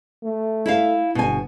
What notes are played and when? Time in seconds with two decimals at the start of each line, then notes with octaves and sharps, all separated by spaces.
0.23 A3
0.66 E4 E5 F5
1.15 G1 B2 G#5